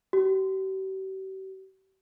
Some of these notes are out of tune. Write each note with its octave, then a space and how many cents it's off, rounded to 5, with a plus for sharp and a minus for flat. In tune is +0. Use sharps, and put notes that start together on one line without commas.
G4 -45